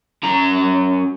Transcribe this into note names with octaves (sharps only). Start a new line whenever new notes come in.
F#2 A#5